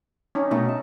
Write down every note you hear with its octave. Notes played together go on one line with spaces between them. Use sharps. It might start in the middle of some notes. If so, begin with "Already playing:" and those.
C#4 D#4
B2 A3 D#4
A5